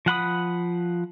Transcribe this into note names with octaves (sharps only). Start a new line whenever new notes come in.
F3 F#5 B5 D#6